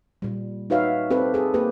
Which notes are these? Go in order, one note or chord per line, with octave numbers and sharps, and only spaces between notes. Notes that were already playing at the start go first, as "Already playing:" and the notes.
A#2 G3
D#4 F#4 B4 C#5 E5 F5
C4 G4 A4 B4
G#4 A4
A#3 G4 B4